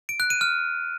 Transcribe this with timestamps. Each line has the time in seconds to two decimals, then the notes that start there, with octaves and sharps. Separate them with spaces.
0.09 D7
0.20 F#6
0.30 D#7
0.41 F6